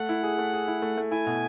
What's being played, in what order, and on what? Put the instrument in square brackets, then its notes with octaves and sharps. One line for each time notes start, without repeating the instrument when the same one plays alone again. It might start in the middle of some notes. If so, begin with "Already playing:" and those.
Already playing: [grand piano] A3 [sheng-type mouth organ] F#5
[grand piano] E4
G#4
A3
G#4
E4
A3
A3
[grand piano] E4 [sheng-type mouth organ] G#5
[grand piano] B2